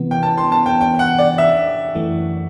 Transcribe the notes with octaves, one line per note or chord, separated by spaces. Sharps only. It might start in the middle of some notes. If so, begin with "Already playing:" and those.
Already playing: C3 E3 B3
G5
A5
C6
A5
G5
G5
F#5
D5
E5
F#2 E3 A3